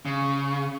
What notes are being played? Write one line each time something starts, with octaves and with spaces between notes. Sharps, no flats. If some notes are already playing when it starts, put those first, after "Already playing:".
C#3